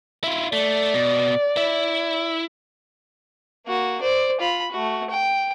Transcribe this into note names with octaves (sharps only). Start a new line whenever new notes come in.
E4 F4
A3 D5
B2
E4
A#3 F#4
C5 D5
F4 B5
A3 F#4
G5